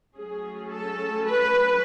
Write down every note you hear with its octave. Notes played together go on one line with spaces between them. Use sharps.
F#3 A3 C#4 G#4
A4
B4